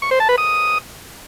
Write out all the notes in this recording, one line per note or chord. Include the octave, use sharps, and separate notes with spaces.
C#6
C5
A5
B4
D#6